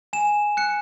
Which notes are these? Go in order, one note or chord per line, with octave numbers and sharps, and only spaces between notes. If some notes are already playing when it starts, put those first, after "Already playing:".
G#5 E7
F#6 C#7